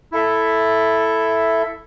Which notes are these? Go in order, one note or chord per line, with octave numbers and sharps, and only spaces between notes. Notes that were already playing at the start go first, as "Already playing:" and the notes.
E4 A4 E5